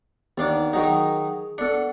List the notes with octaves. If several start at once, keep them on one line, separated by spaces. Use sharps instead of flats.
D#2 B3 D4 D#4 D6
D#3 F#3 D#4 G#4
B3 D4 A4 C#7